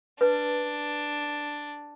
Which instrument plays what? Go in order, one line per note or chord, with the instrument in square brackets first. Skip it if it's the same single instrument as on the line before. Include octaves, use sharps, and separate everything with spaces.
[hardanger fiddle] D4 [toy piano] B4